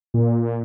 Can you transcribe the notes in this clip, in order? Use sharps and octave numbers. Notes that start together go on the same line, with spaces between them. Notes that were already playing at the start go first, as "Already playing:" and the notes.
A#2